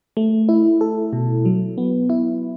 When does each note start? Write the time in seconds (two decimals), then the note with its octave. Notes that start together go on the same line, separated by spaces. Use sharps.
0.17 A3
0.49 E4
0.81 A4
1.13 B2
1.45 F#3
1.78 B3
2.10 E4